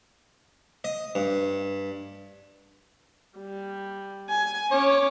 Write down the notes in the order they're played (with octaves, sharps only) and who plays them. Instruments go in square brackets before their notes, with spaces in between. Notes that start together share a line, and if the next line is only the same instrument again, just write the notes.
[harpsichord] D#5
G2
[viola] G3
G#5
[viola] C#4 D6 [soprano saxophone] C#5